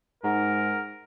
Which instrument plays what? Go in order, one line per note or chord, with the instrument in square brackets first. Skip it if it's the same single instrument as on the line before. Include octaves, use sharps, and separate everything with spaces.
[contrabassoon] G#2 [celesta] D#4 F#5 A#5 [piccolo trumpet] A#4